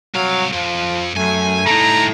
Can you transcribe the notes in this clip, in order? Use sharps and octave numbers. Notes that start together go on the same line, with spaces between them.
C2 F#3 F5
F2 F3
F#2 A3 G#5
G3 D#4 E4 A4 A#5